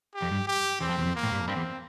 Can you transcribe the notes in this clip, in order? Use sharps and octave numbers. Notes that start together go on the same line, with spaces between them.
G4
F2
G2
G4
E2 C4
F2
E2
F2
A#3
A2
G2
F2
G2 C4
E2